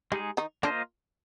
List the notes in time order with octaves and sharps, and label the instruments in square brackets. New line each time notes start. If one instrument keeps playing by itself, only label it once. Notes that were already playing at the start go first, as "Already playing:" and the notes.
[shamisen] G3 [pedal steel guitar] G#3 D#4 G#4
[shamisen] D#3 D#4
[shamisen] D3 D4 [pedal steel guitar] A#3 F4 C5 D#5